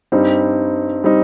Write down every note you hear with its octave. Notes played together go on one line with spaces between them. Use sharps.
G2 G3 C4 D#4
G3 C4 D#4